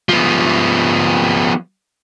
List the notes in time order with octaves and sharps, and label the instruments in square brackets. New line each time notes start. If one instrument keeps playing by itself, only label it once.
[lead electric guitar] F3 B3